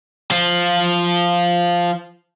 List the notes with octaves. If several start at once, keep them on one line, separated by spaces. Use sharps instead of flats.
F3 F4